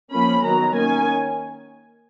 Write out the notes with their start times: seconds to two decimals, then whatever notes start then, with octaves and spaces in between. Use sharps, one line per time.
0.11 F3 A#3 C#4 B5
0.43 D#3 F#3 B3 A#5
0.75 D#3 A#3 C#4 G#5